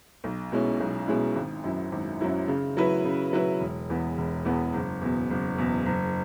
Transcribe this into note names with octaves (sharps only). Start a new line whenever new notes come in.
B1
B2 G#3 C#4 E4
B1
B2 G#3 C#4 E4
G#1
F#2 F#3 E4
G#1
F#2 F#3 E4
C#3
F#3 E4 B4
C#3
F#3 E4 B4
E1
E2 E3 B3
E1
E2 E3 B3
F#1
E2 B2
F#1
E2 B2
F#1